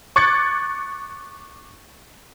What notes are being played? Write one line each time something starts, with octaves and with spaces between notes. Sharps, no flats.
C#6 D6 F#6 G#6 A6 C#7